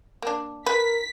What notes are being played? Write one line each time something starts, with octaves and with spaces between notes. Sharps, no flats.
A#3 D4
A#4 B4 B6